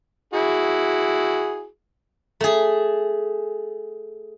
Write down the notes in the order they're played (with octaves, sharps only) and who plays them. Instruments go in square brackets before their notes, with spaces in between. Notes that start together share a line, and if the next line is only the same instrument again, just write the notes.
[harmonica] E4 F#4 G#4
[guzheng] A3 G#4